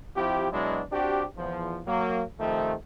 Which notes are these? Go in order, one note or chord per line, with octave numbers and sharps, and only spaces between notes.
F3 C4 E4 G4
B2 F#3 G#3 D4 E4
C4 D4 F#4 G4
E2 F3
F#3 A#3
C3 D#3 F3 A3